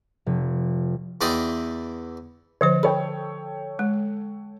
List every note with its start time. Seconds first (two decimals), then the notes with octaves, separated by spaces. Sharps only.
0.26 F1
1.21 E2 E3 D5 D#5 G5 C6
2.61 D3 F3 C5 C#5
2.83 A4 C#5 G5 B5
3.79 G#3